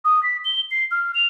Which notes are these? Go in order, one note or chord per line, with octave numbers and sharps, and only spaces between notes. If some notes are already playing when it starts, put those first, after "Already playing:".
D#6
B6
G7
C7
F6
F7